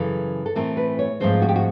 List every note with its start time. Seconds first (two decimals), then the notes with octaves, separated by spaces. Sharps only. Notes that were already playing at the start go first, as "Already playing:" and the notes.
Already playing: F#2 C#3 E3 A4
0.46 A4
0.55 A2 E3 A3 C4 A#4
0.77 B4
0.99 C#5
1.20 G#2 F3 A3 C4 C5
1.42 F#4
1.49 G4
1.56 F#4